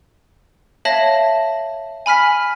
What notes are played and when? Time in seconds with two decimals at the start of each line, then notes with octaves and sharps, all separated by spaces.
0.85 C#5 E5 F5 A5 A#6 F#7
2.06 G#5 B5 F6 B6